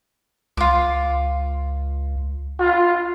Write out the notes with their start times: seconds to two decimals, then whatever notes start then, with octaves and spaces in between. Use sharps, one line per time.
0.57 C#2 F4 D6
2.59 F4